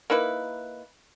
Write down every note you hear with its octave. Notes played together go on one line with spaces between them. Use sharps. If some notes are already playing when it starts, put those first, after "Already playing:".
A#3 D#4 E4 B4